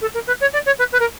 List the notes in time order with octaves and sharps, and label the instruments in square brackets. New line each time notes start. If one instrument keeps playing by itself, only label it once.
[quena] A4
A#4
B4
C#5
D5
C#5
B4
B4
A#4